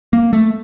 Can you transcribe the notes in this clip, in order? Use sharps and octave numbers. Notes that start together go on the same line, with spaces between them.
A#3
A3